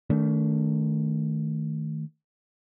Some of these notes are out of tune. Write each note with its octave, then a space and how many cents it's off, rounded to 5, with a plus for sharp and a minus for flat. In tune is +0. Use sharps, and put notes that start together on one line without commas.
D#3 +0 A3 +0 D4 -45